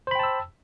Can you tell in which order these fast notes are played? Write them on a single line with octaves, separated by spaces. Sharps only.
C5 B5 G5 A5 E6